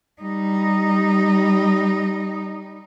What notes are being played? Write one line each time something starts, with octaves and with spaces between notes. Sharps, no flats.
G3 D#4